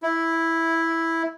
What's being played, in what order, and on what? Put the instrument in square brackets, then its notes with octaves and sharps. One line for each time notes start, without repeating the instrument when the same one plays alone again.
[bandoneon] E4